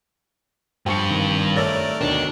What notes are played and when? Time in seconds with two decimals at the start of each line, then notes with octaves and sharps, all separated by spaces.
0.86 G2 F3 G3 G5 C#6 C#7
1.10 G#1
1.56 A3 A#4 C#5 D5 E6 A6
2.01 D2 B2 D#3 D4 C#5